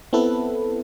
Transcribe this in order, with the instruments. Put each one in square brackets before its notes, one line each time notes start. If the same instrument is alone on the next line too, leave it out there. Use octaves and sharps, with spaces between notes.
[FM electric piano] B3 C4 E4 A4 B4